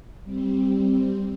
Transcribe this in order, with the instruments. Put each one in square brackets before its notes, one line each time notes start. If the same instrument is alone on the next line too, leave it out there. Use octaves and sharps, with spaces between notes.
[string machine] G3 C4